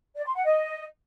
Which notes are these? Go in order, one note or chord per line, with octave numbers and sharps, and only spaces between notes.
D5
C6
F#5
D#5